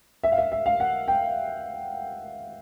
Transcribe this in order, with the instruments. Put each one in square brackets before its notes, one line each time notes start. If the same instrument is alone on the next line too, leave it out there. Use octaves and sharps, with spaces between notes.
[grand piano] E5
F5
E5
E5
F5
F#5
G5